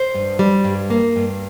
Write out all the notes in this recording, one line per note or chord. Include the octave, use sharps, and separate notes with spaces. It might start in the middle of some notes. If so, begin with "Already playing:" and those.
Already playing: C5
G2
G3
G2
A#3
G2